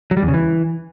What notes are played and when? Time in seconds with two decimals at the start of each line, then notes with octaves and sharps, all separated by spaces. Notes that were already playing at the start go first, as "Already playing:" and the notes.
0.11 F#3
0.17 G3
0.22 E2
0.28 C#3
0.34 E3